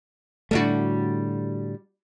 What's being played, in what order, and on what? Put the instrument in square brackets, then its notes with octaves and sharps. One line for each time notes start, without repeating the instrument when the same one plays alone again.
[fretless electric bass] A2 D3 A3 [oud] G3 D4 F#4